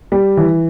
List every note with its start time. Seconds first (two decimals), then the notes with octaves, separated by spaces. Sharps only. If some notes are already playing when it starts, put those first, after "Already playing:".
0.12 G3
0.37 E3